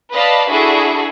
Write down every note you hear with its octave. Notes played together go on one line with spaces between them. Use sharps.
B4 D5 D#5 F5 A5 B5
D4 E4 F#4 G#4 A4